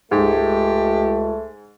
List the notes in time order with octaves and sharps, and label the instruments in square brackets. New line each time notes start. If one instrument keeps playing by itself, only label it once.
[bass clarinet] C#2 [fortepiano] G#2 [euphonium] A3 [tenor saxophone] G4